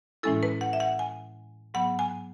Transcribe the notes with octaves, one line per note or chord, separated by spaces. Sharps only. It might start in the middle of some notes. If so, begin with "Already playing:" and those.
A2 E3 G#3 C#4 E4 A4
B4
F#5
E5
F#5
G#5
G#2 F#3 B3 F#5
G#5